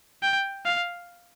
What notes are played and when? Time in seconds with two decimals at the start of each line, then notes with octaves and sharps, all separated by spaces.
0.23 G5
0.65 F5